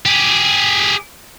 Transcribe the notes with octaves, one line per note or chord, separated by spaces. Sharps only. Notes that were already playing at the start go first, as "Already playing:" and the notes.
G4 G#4